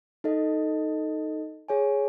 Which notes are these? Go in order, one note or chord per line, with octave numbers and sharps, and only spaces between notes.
D#4 A4 D#5
G#4 C#5 G#5